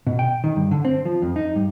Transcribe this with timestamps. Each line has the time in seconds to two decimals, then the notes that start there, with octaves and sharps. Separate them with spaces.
0.07 B2
0.19 G5
0.44 D#3
0.56 G2
0.71 D3
0.85 C4
1.05 F3
1.22 F2
1.36 D#4
1.56 G2